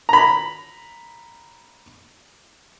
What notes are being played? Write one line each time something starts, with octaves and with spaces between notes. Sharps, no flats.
A#5 B5